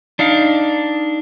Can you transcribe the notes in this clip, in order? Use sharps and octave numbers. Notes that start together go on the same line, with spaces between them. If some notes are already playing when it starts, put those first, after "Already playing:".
D4 D#4 F5